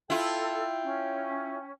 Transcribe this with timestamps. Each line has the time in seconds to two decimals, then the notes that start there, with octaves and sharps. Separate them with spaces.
0.10 E4 F4 A4 G5
0.84 C#4